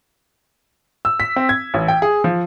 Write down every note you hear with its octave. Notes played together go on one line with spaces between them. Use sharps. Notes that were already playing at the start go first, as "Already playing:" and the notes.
E6
B6
C4
G#6
A1
G5
G#4
F3